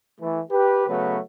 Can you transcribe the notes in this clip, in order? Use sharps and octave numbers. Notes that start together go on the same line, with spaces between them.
E3 A3
G4 B4
C#3 F#3 A3 B3 F#4 B4